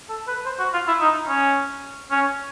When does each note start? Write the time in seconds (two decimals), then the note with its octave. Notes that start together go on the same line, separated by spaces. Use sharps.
0.09 A4
0.27 B4
0.46 C5
0.59 F#4
0.73 F4
0.87 E4
1.00 D#4
1.28 C#4
2.11 C#4